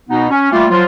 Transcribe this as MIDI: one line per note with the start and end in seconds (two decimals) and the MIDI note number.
0.09 0.26 47
0.09 0.26 59
0.09 0.26 63
0.30 0.51 61
0.52 0.66 55
0.52 0.66 57
0.52 0.66 58
0.52 0.66 65
0.70 0.84 53
0.70 0.84 54
0.70 0.84 65